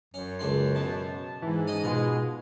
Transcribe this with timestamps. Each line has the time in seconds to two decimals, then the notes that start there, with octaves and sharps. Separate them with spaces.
0.14 F#2 C#4
0.39 C#2 D4 C6
0.75 B2 A5
1.42 G#2 E3
1.67 C#4 D#5 D#7
1.84 B2 G#3 F4